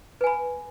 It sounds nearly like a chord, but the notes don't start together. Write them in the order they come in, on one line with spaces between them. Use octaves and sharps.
B4 G#5 B5